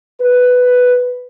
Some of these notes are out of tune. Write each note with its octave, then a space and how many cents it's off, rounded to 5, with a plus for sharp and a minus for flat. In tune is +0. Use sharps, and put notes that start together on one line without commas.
B4 +5